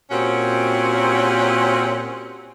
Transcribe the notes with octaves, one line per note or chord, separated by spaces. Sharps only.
A#2 C4 C#4 F#4 G4